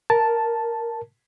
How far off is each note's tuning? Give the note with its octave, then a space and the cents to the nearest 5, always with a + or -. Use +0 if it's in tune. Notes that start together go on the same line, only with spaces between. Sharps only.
A#4 +0 A5 +0